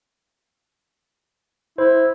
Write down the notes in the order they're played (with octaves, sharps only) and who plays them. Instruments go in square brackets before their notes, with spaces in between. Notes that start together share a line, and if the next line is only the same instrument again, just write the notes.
[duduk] E4 [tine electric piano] C5